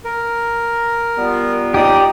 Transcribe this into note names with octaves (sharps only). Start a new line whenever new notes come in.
A#4
G3 B3 F4
D#2 D#4 G4 D5 D#6